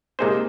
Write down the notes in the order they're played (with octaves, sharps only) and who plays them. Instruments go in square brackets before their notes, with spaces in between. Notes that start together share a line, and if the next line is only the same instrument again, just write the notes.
[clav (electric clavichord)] C3 G#3 D#4 G#4 C5 [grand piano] A#3